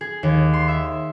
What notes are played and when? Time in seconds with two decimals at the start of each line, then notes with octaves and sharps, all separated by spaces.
0.01 G#4
0.23 D#2
0.53 C6
0.68 E5